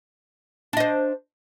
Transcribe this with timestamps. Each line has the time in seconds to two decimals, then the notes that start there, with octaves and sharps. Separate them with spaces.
0.73 D4
0.77 D#5
0.80 C5